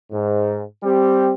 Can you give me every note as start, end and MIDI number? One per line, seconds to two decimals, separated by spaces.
0.12 0.60 44
0.83 1.34 55
0.83 1.34 60
0.83 1.34 67